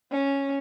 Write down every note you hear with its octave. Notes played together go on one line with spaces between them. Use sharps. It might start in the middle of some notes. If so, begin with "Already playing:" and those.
C#4